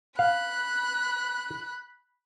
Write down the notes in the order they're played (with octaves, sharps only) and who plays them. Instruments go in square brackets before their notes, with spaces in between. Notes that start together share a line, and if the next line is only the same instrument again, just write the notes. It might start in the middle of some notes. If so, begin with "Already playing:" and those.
[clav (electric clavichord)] F5 [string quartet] B5 F#6